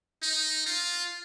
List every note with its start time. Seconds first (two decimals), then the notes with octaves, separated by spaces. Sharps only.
0.22 D#4
0.66 F4